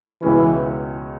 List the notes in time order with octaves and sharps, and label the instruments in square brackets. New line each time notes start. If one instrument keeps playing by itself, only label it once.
[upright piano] C#2 B2 G#3 C#4 [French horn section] E3